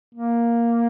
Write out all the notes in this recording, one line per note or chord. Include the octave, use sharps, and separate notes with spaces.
A#3